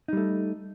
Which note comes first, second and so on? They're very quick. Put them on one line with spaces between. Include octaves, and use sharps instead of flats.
D#4 G3 A3